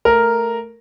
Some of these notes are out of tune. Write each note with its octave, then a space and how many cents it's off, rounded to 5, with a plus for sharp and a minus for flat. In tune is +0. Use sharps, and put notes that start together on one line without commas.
A3 +0 A#4 +0